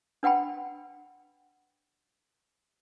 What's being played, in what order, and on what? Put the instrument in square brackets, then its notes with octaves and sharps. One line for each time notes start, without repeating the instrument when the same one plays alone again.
[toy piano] D4 B4 F#5 G5 B5